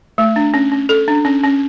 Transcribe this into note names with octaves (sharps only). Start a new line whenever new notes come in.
A3
D4
C#4
C#4
A4
D4
C#4
C#4